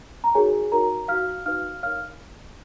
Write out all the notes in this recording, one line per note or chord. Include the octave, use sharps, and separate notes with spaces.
A#5
D#4 F#4 G#4 A#4 C#5 G#5
D#4 F#4 A#4 C#5 A#5
D#4 F#4 B4 F5 F6
D#4 F#4 B4 F5 F6
D#4 A#4 C#5 F5 F6